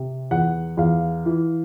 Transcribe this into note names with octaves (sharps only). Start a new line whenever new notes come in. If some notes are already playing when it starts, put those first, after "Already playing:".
Already playing: C3
E2 F#5
E2 F5
E3